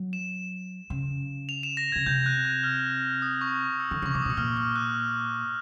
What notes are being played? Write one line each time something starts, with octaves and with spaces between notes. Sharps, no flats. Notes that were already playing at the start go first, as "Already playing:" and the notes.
Already playing: F#3
E7
C#3
F7
E7
A#6
C#3 G#6
C3 G6
F#6
F#6
F6
D#6
C#6
E6
D3
C#3 C#6
C3 D6
D#6
B2 E6
A#2 F6
F6
F#6